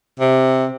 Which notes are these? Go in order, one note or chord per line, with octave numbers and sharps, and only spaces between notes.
C3